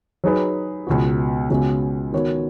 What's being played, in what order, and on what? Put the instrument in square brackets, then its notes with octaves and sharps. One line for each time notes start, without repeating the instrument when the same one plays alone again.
[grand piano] F#3 D#4 G#4 B4
C#2 B2 B3 F#4
C#2 C#3 G#3 B3 F#4
D#3 B3 F#4 C#5